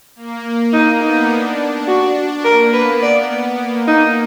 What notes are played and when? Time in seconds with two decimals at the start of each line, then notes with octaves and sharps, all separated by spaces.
0.16 A#3
0.72 A#3 D#4
1.01 B3 D#4
1.30 D4
1.59 D4
1.87 F#4
2.16 D4
2.44 A#3 A#4
2.73 B3 B4
3.02 D5
3.59 A#3
3.87 D#4